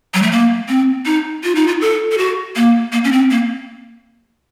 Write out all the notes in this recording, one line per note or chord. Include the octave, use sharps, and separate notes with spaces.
F#3
A3
A#3
C4
D#4
F4
D#4
F4
A4
A4
F#4
A#3
A#3
C#4
C4
A#3